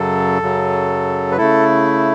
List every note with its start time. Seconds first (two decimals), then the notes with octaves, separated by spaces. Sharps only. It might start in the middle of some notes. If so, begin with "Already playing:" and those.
Already playing: F#2 C#3 F#3 A4
0.42 F#2 C#3 F#3
1.32 B4
1.37 C#3 A3 E4 A4